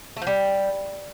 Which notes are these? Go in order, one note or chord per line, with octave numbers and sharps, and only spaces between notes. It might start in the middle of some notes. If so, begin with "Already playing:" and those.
A3
F3
G3